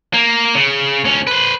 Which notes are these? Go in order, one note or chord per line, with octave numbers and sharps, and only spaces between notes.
A#3
C#3
D2 C#4
B4 C5